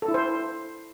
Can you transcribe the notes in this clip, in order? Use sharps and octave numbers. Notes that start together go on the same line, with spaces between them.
A4
E4
C5